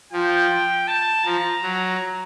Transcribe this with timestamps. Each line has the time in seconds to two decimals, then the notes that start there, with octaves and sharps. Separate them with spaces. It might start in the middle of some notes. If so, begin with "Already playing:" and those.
0.12 F3 G5
0.87 A5
1.25 F3 A#5
1.63 F#3